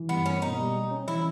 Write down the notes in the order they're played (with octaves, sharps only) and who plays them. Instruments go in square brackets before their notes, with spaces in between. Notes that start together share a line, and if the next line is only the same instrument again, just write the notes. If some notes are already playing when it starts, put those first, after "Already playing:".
Already playing: [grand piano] E3
[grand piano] G2 [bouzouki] B3
[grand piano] A#3 [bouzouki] C#4
[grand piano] B2 [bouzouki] D#4
[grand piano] G3
G4
C#4
[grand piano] E3 [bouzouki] E4